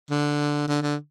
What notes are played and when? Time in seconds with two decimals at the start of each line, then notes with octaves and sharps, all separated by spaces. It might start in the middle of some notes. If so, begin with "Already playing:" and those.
0.10 D3
0.68 D3
0.82 D3